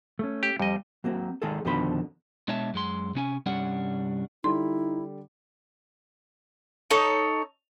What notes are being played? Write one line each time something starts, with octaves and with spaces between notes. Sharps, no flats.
A3 C#4
G4
F2 G3 D#5
F#3 A#3 C4
D#3 G#3 D#4 G#4 A4
F2 B2 D3 D#3 C5 B5
B2 G#3 D4 C#5 E5 A5
F#2 G#3 C6
C3 C#4 G#5
C2 G2 G3 C#4 D4 F#5
D3 G3 D#4 E4 A4 C6
D#4 A4 C#5